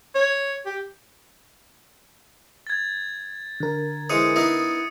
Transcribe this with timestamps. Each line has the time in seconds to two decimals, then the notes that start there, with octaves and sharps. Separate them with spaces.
0.15 C#5
0.66 G4
2.67 G#6 A6
3.60 D3 A#4
4.10 E3 G#3 C5 D#6 C#7 D#7
4.36 B3 D#4 E4 D#6